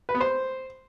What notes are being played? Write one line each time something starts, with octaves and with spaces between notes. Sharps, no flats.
B4
B3
C5